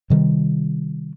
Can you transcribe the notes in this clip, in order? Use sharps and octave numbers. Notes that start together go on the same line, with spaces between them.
C3 D#3 G3